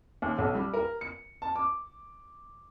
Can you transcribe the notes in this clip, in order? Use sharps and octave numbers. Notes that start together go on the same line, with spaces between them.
D#2
B1
G3
A#4
C#7
A5
D6